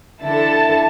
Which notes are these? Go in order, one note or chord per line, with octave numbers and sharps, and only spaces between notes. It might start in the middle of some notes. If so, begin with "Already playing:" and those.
D3 E4 A4 A5